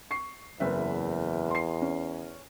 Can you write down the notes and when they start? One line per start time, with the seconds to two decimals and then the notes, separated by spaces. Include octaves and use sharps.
0.11 C#6 C7
0.60 F#1 E2 B4 E5
1.51 C6 C7
1.82 C#4